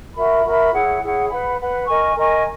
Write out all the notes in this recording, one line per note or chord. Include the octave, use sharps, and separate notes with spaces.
F#4 A#4 E5 B5
F#4 A#4 E5 B5
E4 G#4 C#5 F#5
E4 G#4 C#5 F#5
B4 F#5 B5
B4 F#5 B5
A#4 D#5 G#5 C#6
A#4 D#5 G#5 C#6